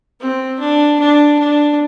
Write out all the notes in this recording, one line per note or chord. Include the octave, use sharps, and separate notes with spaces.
C4
D4
D4
D4